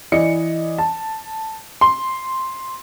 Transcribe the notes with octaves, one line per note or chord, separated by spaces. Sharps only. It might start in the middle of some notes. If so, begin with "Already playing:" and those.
E3 D5 D#5 C#7
A5
C6